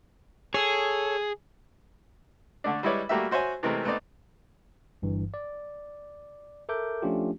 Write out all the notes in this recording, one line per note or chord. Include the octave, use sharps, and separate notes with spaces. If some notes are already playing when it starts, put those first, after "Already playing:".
G#4 A4 C#5
D3 A3 D4
G3 G#3 E4 B4 C#5 D5
G3 A3 A#3 F#4 G4 E5
F#4 C5 C#5 E5 G#5
C3 E3 G#3 A3 C4 A#4
A3 B3 C4 D#4 D5
G1 G2 E3
D5
A4 A#4 E5 D6 G6
F3 A3 C#4 D4 F4 G4